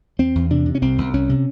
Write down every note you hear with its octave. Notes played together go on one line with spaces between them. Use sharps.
E2 C4
E2
C3 D4
C3
C#4
C2 C4
C2
C2 C#4
C3